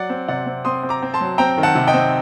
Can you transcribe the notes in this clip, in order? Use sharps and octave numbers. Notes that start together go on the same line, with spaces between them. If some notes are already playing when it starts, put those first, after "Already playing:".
Already playing: F#3 D5 F#5
C4
C3 D5 F#5
C4
C4 C6 D#6
C4
A#5 D6
C4
A5 C6
F#3
C4 G5 A#5
D#3
F#5 A5
C3
D#5 G5
C4